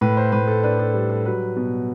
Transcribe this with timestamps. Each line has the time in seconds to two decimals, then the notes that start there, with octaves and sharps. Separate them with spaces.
0.01 A2 B4
0.17 C5
0.32 A2 B4
0.48 A4
0.63 D4 B4
0.79 A4
0.94 G3
1.10 A4
1.26 F#3 B4
1.56 B2